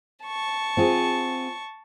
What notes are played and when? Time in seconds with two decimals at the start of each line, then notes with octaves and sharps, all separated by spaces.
0.25 A5 C#6
0.77 C4 F4 G#4